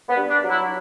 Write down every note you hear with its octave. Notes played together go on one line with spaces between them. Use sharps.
B3
G2
D4
F#3
E4